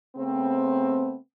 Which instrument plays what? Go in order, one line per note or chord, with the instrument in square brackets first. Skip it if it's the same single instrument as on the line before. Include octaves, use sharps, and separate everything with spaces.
[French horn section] C#3 A3 B3 C4